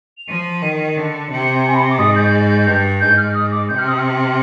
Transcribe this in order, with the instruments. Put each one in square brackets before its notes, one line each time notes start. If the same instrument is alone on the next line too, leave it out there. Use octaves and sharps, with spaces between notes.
[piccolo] F7
[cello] F3 [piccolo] D#7
[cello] D#3
D3
C3
[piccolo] G#5
B5
C6
D6
[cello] G#2 [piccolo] D#6
[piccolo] G6
[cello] G2
[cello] G#2 [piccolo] G6
[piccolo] F6
D#6
D6
[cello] C3 [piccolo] G6
[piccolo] F6
D#6
F6